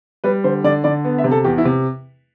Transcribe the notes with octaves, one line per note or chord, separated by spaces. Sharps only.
G3 B4
D3 C5
D3 D5
D3 D5
B3
E5
C3
A4
E2 G4
E4
C3